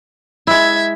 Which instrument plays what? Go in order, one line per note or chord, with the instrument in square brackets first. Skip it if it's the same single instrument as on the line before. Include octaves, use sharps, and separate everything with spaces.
[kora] G#3 E4 [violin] E5 G#6